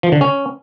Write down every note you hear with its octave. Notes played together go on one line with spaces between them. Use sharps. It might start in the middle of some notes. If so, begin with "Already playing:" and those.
F3
D3
C#4